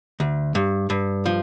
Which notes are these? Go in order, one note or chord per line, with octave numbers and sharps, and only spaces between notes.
D2
G2
G2
F3